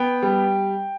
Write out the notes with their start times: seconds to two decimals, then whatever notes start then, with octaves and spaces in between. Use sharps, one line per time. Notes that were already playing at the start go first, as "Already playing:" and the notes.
Already playing: B3 G5
0.22 G3